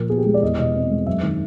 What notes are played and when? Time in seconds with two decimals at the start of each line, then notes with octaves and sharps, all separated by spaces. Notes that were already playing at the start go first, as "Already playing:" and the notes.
Already playing: A#2 F3 A#4
0.10 B3 G#4
0.18 G4
0.26 G#3 G#4
0.34 D5
0.42 E2 D#5
0.59 B2 D#5
0.75 C4
0.91 G#3
1.07 F#2 E5
1.23 D#3